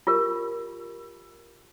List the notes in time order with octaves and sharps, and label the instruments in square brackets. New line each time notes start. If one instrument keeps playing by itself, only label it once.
[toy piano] F4 G4 A#4